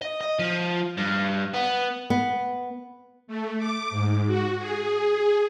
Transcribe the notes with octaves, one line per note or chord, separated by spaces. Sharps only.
D#5
D#5
F3
G2
B3
B3
A3
D6
G#2
F#4
G#4